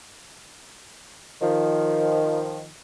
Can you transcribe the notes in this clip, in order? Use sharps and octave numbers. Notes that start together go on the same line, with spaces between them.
D#3 F3